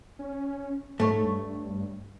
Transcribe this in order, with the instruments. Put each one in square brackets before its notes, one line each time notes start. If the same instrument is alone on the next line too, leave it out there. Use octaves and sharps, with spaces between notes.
[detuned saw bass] C#4
[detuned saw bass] G#2 [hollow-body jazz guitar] A3 C#5
[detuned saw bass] G2